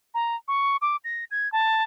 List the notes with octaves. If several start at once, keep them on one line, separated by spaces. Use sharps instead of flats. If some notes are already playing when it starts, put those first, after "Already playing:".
A#5
C#6
D6
A#6
G#6
A5